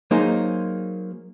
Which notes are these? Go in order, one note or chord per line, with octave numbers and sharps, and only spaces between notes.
F#3 A#3 D#4 G#4 C5